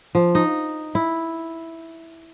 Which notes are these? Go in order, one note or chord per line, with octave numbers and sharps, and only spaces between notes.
F3
D#4
E4